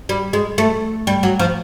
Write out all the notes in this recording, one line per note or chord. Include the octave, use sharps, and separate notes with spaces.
G3
G#3
A3
G3
F#3
F3